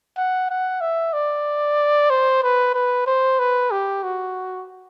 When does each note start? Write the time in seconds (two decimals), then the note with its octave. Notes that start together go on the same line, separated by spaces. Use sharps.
0.17 F#5
0.50 F#5
0.81 E5
1.13 D5
2.10 C5
2.43 B4
2.74 B4
3.07 C5
3.39 B4
3.71 G4
4.03 F#4